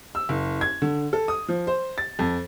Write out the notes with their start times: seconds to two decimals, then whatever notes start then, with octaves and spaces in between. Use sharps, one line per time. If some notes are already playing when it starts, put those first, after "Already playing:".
0.15 E6
0.29 F#1
0.61 G#6
0.82 D3
1.13 A4
1.28 D#6
1.48 F3
1.67 C5
1.98 A6
2.19 F2